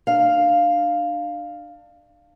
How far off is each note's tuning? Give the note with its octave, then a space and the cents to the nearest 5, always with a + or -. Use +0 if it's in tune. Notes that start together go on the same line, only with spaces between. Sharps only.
D4 +30 F5 +0